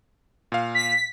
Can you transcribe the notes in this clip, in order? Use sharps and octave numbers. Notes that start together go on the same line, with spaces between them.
A#2 F5
B6